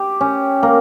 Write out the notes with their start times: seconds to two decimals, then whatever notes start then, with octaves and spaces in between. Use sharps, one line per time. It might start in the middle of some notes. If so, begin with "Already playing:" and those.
Already playing: G4
0.21 C#4
0.63 A#3